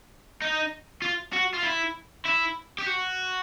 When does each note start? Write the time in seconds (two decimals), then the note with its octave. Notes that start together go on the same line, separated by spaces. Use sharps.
0.42 D#4
1.02 F4
1.33 F#4
1.54 F4
1.63 E4
2.25 E4
2.79 G4
2.86 F#4